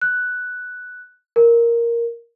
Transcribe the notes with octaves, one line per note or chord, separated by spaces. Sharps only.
F#6
A#4